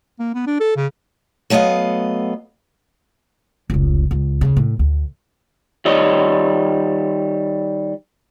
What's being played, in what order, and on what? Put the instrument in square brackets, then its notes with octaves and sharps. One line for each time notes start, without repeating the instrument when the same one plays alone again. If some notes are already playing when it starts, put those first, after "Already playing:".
[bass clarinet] A#3
B3
D4
A4
C#3
[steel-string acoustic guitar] F#3 A3 B3 D#5 F5
[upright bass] F1 C#2
C#2
D2 C#3
A2
D2
[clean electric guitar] D#3 G3 C#5 D#5